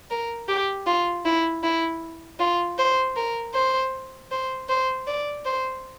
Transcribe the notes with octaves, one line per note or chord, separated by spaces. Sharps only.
A#4
G4
F4
E4
E4
F4
C5
A#4
C5
C5
C5
D5
C5